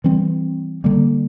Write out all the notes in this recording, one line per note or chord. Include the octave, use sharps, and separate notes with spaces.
E3 G3 C4
D3 G3 A#3